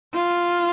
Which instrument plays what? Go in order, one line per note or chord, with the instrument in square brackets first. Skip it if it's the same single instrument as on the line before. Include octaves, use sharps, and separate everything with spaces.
[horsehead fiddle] F4